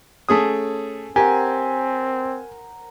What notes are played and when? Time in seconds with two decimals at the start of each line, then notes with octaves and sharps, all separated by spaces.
0.29 A3 C#4 G#4 A4 D#6
1.16 C4 G4 A#4 C5 F#5 G#5